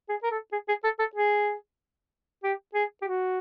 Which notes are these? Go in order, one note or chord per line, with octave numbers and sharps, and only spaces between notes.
G#4
A#4
A4
G#4
G#4
A4
A4
G#4
G4
G#4
G4
F#4